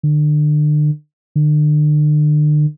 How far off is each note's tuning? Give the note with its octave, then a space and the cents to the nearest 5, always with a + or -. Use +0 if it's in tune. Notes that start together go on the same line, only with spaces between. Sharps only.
D3 +35
D3 +40